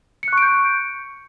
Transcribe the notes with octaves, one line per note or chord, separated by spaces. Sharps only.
C#6 F#6 G6 C#7 D7